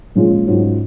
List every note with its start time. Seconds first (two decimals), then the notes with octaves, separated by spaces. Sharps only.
0.15 A#2 F3 G#3 C#4 F4
0.47 G#2 F#3 C#4 F4